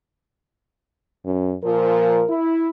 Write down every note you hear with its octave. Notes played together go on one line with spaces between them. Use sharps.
F#2
A#2 F3 A#4
E4